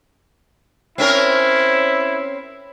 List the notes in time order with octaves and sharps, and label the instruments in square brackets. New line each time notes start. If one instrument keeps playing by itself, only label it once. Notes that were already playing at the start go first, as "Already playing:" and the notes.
[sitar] C4 C#4 A#4 [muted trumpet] E4